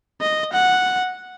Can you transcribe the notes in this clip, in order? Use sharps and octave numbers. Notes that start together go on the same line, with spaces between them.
D#5
F#5